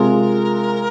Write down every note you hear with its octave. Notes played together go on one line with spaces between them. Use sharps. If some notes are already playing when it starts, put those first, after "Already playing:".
Already playing: C3 G#3 F4 G#4 A#4